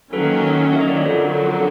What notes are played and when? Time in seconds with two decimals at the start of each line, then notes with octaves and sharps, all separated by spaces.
0.13 D#3 F#3 A#3 C#4 A4 B4
0.73 E5
0.81 D#5
0.89 D5
0.97 C#5
1.05 F2 D3 F#3 A#4 C5